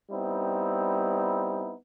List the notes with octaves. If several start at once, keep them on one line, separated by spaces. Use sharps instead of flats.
G3 B3 C4 D#4 E4